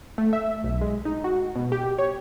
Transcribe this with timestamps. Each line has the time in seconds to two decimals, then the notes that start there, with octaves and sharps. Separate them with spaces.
0.18 A3
0.33 E5
0.64 B1
0.81 G#3
1.05 D#4
1.24 F#4
1.56 B2
1.72 G4
1.99 C#5